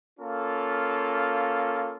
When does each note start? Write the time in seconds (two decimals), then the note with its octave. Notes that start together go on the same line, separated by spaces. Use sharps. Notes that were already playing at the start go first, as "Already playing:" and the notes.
0.19 A#3 C#4 F4 A4